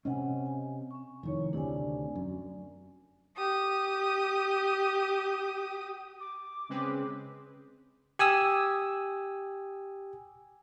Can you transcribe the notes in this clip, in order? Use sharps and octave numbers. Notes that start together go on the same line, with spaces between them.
C3 C4 C#4 D#5 F#5 G#5
G#5
C4 C#6
F1 D#3 E4 C#5
D2 C3 D4 D5 G#5
F#2
G4 D#6
D6
C#3 G#3 C4 B4
G4 G#5 D#6 E6